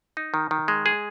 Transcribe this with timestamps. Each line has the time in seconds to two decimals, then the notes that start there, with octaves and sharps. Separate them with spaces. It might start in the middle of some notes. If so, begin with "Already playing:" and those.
0.17 D#4
0.34 D#3
0.51 D#3
0.68 G#3
0.86 G#4